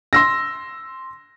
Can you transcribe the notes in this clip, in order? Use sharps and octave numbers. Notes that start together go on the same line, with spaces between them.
C6 E6 A#6